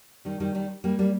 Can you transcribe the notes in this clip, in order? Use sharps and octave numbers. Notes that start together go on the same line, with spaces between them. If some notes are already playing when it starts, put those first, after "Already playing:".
D#3 G3
D#3 G3
D#3 G3
G3 A#3
G3 A#3